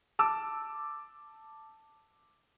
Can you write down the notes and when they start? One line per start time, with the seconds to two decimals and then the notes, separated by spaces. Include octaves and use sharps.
0.19 A5 D6 E6